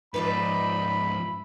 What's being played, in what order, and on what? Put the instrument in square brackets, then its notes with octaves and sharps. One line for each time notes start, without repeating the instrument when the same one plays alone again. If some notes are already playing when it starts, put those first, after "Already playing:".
[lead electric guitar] G#2 F3 [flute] D#4 [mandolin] B4 D5 E5 [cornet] B5